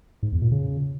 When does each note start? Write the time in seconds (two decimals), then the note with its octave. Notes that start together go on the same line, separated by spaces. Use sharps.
0.23 G#2
0.32 E2
0.42 A#2
0.52 C#3